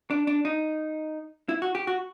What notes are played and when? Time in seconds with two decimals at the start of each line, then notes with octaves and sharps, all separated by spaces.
0.11 D4
0.27 D4
0.45 D#4
1.49 E4
1.62 F#4
1.75 G4
1.87 F#4